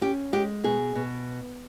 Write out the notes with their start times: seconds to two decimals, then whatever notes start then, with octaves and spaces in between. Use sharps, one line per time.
0.01 C#4 G4
0.33 G#3 G4
0.64 B2 G#4
0.95 B2